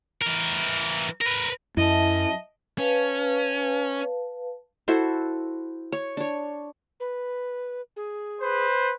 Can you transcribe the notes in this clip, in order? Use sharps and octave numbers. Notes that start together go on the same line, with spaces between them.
E3 A#4
A#4 B4
F#2 F#3 E4 D#5 E5 A5
C#4 B4 F5 A5
E4 F#4 A4 C5
C#5
D4 C#5
B4
G#4
B4 C5